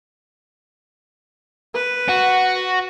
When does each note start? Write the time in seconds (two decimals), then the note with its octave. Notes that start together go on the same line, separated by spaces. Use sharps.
1.74 B4
2.09 F#4